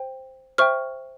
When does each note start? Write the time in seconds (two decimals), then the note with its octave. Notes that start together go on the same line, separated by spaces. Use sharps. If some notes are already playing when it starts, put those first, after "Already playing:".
Already playing: C5 G5
0.58 C5 E5 G5 C#6 F6